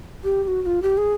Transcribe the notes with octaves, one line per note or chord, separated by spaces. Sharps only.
G4
G4
F#4
F#4
F4
G4
G#4